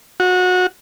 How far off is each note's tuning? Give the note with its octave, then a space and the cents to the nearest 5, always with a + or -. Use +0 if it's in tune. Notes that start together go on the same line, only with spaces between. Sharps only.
F#4 -25